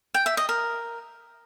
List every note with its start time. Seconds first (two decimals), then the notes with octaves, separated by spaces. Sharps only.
0.14 G5
0.26 E5
0.37 D#5
0.49 A#4